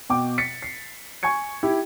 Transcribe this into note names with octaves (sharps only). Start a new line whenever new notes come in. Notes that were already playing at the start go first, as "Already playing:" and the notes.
B2 G5 D6
A6 B6 C#7
C7
G#5 C#6 G#6 C#7
E4 G4